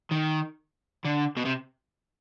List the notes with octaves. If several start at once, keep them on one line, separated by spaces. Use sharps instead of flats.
D#3
D3
B2
C3